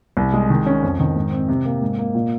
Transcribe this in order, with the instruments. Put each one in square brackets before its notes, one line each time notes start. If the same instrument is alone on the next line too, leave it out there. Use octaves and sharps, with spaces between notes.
[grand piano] C2
G#3
D#3
C#4
F2
D#3
G#2
C4
C3
A#3
G#2
A#3
A#2